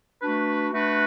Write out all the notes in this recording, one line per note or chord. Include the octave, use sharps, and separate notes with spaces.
A3 D4 F#4 B4
A3 D4 F#4 B4